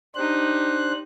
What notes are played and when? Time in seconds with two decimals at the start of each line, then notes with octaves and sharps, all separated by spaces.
0.15 D4 D#4 G4 C5 F#6